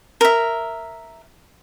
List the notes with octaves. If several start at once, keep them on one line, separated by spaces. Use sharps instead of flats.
A#4 E5